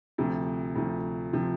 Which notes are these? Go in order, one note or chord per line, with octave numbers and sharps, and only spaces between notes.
D2 C3 F3
D2 C3 F3
C3 F3